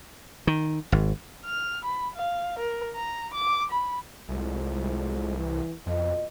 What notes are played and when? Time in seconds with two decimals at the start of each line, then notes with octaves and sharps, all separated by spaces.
0.47 D#3
0.92 G#1
1.45 F6
1.85 B5
2.16 F5
2.59 A#4
2.95 A#5
3.34 D6
3.71 B5
4.29 C2 A2 F3 G#3
5.36 E3
5.86 F2 B2 F4 D#5